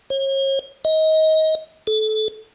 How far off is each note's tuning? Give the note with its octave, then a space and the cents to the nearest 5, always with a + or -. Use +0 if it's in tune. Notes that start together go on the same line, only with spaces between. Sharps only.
C#5 -40
D#5 +25
A4 -25